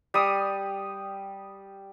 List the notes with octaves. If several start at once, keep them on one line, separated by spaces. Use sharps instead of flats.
G3 D#6